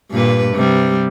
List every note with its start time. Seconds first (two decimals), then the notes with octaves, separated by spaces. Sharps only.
0.11 G2 A#2 B4
0.55 C3 G3